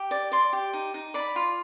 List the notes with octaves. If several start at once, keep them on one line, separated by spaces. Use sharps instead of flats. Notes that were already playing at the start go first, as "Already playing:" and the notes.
Already playing: G4
D5
D5 C6
G4
D#4
D#4
D5 B5
F4